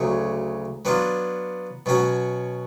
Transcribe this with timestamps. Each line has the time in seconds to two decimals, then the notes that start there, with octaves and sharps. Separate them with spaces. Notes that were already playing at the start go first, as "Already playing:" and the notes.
Already playing: D2 C#3 F#3
0.85 F#3 B3 D4 F4
1.86 B2 F#3 C#4 F#4